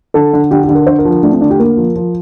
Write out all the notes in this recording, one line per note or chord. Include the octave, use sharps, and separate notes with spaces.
D3 A4
D3
D3 G4
G4
D3
A#4
D3 C5
A#4
F3
A#4
A3 D4
C4
D3 D4
G4
A#3 A#4
F3
F3